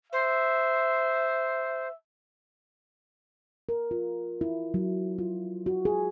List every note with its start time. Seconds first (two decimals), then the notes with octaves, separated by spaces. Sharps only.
0.12 C5 E5
3.69 A#4
3.91 F4
4.41 E4
4.74 F#3
5.18 F4
5.66 F#4
5.85 G#4